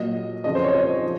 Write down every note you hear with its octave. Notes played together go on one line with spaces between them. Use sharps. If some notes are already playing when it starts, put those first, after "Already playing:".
Already playing: A#2 F#3 D#5
F2 C#3 F3 D#5
C5
C#5
D#5
F3